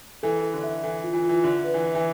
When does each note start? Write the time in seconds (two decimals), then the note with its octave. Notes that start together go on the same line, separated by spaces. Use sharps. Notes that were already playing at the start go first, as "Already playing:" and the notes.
0.23 E3 A4
0.43 A4
0.54 D3
0.63 E5
0.83 E3 A4
1.04 F4
1.13 E3
1.24 F4
1.29 E3
1.44 D3 E5
1.64 B4
1.74 E3
1.84 E5
1.95 E3